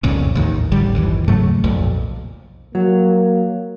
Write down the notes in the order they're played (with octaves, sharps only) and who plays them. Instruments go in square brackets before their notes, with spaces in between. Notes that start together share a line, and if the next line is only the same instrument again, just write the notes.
[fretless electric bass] C2 F2 A#2 C#3
A1 D#2 D#3
A1 D3 G3
G1 D#2 E3
G#2 C#3 F#3 A3
B1 F2 A#2
[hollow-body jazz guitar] F#3 [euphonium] A#3